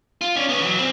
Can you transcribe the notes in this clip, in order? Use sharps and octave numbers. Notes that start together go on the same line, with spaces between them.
F4
C#4 D4
B3 C#4
E3 F#3
A#2 C4